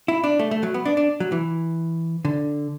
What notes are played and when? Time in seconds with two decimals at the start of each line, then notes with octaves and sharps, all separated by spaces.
0.08 E4
0.24 D4
0.39 A3
0.51 A3
0.63 F#3
0.74 B3
0.85 D4
0.97 D4
1.20 F#3
1.32 E3
2.25 D3